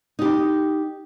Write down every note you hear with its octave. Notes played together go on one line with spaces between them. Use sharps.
D#4 G4